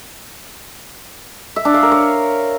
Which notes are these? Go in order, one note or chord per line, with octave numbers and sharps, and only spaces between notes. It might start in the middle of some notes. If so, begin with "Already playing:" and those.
E5
D4
F5
A#4
C#5